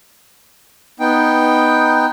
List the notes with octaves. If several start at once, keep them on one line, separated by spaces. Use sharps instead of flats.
B3 D#4 G5